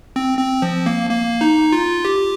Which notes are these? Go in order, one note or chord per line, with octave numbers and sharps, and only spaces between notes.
C4
C4
F3
A#3
A#3
D#4
F4
G4